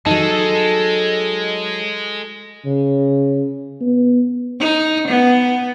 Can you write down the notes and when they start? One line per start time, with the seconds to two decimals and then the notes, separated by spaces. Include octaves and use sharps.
0.06 F#3 G#3 D#4 A4 A5
2.65 C#3
3.81 B3
4.60 D#4
5.08 B3